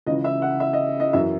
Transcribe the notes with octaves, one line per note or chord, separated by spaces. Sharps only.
C#2 C#3 E3 D#5
E5
F#5
E5
D#5
D#5
F#2 E3 E5